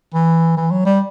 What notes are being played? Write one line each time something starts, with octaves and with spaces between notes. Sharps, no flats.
E3
E3
F#3
G3